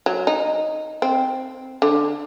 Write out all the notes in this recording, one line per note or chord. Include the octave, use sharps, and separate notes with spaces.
F#3
D#4
C4
D3